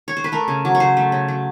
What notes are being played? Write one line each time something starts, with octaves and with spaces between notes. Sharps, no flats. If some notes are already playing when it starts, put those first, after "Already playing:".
C#5
C5
B4
A3 A#4
C#3
F#3
C#5
C#3 C5
A3
C#3
F#3